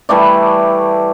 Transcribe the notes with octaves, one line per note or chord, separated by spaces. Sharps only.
E3 G3 A3 D5